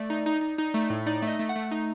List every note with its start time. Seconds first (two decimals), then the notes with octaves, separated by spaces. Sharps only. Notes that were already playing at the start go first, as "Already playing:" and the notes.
Already playing: A3 D5
0.10 D#4
0.26 D#4
0.41 D#4
0.58 D#4
0.74 A3
0.90 A2
1.06 D#4 D5
1.22 A3
1.27 D#5
1.39 A3
1.49 F#5
1.56 A3
1.71 D#4